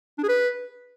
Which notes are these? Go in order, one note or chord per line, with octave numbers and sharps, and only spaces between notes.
D4
G#4
B4